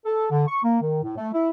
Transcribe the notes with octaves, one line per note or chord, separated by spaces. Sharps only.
A4
D3
C#6
A#3
D#3
A2
A3
E4